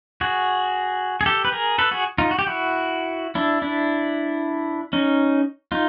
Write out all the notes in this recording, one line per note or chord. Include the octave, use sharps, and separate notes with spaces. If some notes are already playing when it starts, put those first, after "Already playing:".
F#4 G#4
G#4
G4 A4
B4
G#4 A#4
A4 B4
F#4 G#4
D#4 F4
F#4
G4
E4 F#4
D4 E4
D4 E4
C#4 D#4
D#4 F4